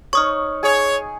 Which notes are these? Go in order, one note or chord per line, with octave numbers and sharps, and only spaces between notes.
D#4 C#5 C#6 D#6 F6
G#4 C#5